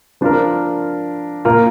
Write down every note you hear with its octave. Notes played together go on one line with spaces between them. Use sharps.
F3 D4 F4 A#4
A#2 A#3 F4 A#4